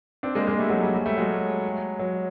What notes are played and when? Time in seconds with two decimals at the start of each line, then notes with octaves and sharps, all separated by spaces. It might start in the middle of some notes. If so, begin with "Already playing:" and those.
0.23 C4 D4
0.35 G#3 A#3
0.47 G#3 A#3
0.59 G3 A3
0.70 F#3 G#3
0.83 G3
0.95 G3
1.06 G3 A3
1.17 F#3 G#3
1.99 F#3